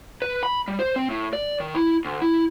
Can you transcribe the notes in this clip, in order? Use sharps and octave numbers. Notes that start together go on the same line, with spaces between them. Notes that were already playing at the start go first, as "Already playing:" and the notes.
B4
B5
G3
C5
C4
A2
D5
D#3
E4
D2
E4